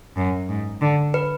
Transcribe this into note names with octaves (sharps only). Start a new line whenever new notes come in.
F#2
G#2
D3
B4